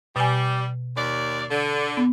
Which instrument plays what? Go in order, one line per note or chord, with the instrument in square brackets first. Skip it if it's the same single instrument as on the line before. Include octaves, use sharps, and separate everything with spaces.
[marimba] B2 G#5 [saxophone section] G3
[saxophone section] D#2 D5
D3
[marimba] B3